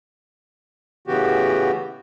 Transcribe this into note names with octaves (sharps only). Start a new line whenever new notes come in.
A2 C#3 E3 B3 F#4 G4